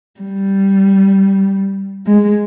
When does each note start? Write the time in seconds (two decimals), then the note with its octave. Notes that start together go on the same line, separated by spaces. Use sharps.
0.20 G3
2.06 G#3